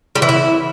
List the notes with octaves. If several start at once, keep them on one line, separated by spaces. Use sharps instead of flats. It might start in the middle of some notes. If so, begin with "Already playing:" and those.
G3
E3
E4